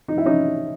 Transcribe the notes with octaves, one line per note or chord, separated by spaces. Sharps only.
D#4
E4
C#4 D#4